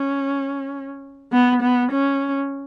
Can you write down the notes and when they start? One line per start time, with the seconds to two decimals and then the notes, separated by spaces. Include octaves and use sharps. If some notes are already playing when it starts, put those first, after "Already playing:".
Already playing: C#4
1.32 B3
1.62 B3
1.92 C#4